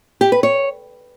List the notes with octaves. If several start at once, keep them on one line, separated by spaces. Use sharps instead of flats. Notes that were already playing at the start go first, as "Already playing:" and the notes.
G4
B4
C#5